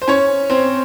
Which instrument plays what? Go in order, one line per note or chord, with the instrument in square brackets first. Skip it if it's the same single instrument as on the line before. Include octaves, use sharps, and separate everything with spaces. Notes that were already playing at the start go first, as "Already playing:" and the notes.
[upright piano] C5
C#4 C#5
C4 C5